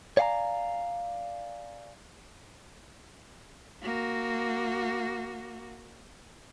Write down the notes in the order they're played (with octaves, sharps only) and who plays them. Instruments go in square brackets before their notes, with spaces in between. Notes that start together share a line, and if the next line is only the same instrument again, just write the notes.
[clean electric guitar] C#5 D5 F5 F#5 G#5 A#5
[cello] A#3 F#4